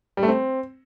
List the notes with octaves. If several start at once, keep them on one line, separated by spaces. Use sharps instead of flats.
G3
A3
C4